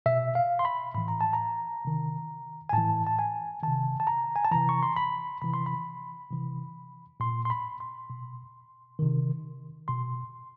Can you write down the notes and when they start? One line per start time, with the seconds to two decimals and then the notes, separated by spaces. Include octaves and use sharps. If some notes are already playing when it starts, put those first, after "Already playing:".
0.06 B2 E5
0.35 F5
0.59 C6
0.65 B5
0.95 A2 E3 B5
1.08 A#5
1.21 A5
1.33 A#5
1.85 C3 D#3
2.69 G#5
2.73 A2 E3 A5
3.07 A5
3.19 G#5
3.63 C3 D#3 A5
4.00 A5
4.07 A#5
4.36 G#5
4.45 A5
4.52 C3 E3 A#5
4.69 C#6
4.83 C6
4.96 B5
5.42 C3 E3 B5
5.54 C6
5.66 B5
6.31 C3 E3
7.20 A#2 C6
7.45 C6
7.50 B5
7.80 C6
8.10 B2
8.99 C3 D#3
9.88 B2 C6